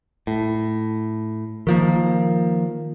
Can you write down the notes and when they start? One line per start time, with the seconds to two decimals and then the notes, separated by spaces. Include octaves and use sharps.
0.27 A2
1.67 D#3 F3 A#3